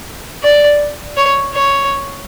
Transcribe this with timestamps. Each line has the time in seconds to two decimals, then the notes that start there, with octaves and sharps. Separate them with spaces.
0.44 D5
1.17 C#5
1.54 C#5